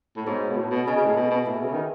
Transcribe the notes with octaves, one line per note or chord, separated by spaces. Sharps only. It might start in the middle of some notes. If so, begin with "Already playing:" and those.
A2
G#2 B3 F#4 C#5
B2
A2
B2
C#3 G#4 D#5 G#5
C#3
A2
B2
B2
A2 G#4 B4 E5 G#5
B2
C#3
D#3